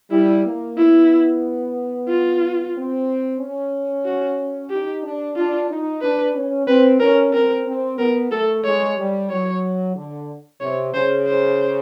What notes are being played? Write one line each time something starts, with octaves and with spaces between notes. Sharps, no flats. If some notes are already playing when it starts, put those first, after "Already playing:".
G3 E4
A#3
B3 E4
F4
C4
C#4
F#4
D#4 G4
D4
D4 F4
D#4
D4 B4
C#4
C4 B4
C#4 A#4
C4 A#4
C4
B3 A#4
A3 A4
G#3 C#5
G3
F#3 C#5
D3
C3 C#5
C#3 C5
C5